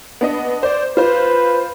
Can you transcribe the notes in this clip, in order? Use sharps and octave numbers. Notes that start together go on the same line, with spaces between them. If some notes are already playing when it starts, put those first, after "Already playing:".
B3 D4 D#5
C5 D5
F4 B4 C5